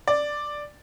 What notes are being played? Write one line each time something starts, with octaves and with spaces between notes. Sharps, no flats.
D5